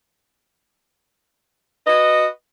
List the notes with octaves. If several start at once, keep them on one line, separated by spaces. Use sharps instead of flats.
F#4 B4 D#5